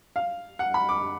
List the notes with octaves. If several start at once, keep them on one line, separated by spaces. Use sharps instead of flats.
F5
F#5
B5
D6